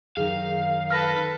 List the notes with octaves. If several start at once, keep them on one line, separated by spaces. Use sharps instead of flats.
F#2 D#3 G#4 F5
A4 B4 F6 A#6